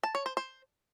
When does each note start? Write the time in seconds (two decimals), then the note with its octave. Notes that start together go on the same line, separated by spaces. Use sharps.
0.03 A5
0.15 C#5
0.26 C5
0.37 C5